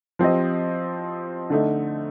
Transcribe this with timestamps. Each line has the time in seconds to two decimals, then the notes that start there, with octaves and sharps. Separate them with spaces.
0.19 F3 C4 G4 C5 D#5
1.50 D3 A3 D#4